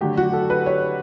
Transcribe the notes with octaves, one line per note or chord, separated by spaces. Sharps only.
D3 F#3 A3 G4
F#4
A4
B4
C#5